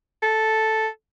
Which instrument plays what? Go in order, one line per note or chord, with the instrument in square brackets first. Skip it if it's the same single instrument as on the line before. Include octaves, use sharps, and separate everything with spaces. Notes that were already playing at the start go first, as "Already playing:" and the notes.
[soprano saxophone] A4